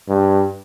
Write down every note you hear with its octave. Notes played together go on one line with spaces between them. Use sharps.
G2